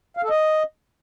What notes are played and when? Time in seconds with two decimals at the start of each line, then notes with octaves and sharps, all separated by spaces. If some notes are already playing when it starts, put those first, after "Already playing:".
0.17 F5
0.23 A4
0.30 D#5